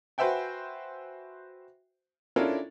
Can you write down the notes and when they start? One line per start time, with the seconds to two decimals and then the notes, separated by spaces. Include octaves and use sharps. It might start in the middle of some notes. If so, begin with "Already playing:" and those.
0.18 F#4 B4 C5 E5 G5 G#5
2.36 C#4 D4 E4 F4 A4 A#4